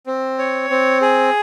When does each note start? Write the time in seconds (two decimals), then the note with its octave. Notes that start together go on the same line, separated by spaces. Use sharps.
0.07 C4
0.38 C#5
0.70 C4
1.01 G#4